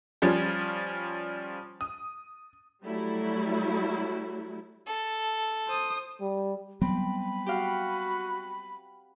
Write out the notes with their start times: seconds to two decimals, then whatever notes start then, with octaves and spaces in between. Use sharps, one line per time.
0.22 F3 G3 C#4
1.81 D#6
2.85 F#3 G3 A3 E4
4.87 A4
5.68 C5 D#6
6.21 G3
6.82 F#3 G3 B3 C4 B5
7.46 F#4 G4 F5 F#5